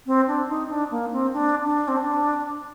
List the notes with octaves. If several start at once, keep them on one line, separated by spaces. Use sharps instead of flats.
C4
D4
D#4
D4
A#3
C4
D4
D4
C4
D4